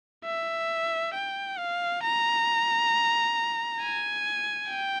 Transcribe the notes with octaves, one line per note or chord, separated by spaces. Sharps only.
E5
G5
F5
A#5
G#5
G5